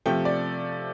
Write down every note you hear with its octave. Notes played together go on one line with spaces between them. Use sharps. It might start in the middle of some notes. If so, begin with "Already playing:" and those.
C3 F3 A3 G5
D5